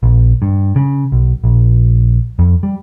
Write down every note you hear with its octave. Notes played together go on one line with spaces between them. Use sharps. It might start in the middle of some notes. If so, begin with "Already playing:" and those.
A#1
G2
C#3
B1
A#1
F2
G3